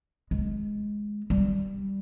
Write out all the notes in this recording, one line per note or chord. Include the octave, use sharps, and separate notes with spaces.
G#3
G3